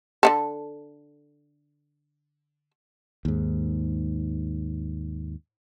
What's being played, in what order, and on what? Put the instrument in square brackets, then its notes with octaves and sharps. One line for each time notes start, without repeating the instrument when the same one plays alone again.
[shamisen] D3 D#3 A4
[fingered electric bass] D#2 G#2